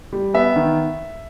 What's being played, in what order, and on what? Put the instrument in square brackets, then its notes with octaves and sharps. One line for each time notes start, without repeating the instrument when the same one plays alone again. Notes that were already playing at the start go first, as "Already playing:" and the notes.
[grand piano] G3
B3 E5
D#3